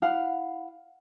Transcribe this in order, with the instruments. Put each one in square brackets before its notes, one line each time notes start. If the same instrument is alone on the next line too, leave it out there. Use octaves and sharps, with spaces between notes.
[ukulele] E4 F5 F#5